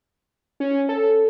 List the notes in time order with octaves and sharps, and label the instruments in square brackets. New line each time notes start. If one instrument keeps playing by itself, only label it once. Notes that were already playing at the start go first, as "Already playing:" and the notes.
[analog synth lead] C#4
A4